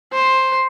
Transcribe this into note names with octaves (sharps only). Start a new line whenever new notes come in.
C5